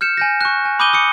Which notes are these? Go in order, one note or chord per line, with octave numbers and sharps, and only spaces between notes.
F6 G6 C#7 E7
G#5 G6 A#6
C#6 F#6
G#5
B5 D6 D#6 G6 D#7 G7
D#6 C#7